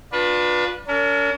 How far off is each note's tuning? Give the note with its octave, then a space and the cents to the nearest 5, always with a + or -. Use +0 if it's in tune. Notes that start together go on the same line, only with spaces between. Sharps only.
D4 +0 F4 +35 B4 -15
C#4 +45 A#4 -30